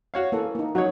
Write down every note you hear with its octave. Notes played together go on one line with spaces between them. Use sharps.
F#4 C#5 F5
E3 A#3 A4
A#3 D#4
F#3 D#4 F#4 C#5 F#5